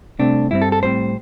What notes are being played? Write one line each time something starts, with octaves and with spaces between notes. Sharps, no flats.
C2 C3 A3 C4 D4
G2 G3 C4 E4
A4
A4
A2 G3 C4 C5